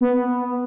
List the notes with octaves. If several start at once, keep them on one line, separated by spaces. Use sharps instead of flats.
B3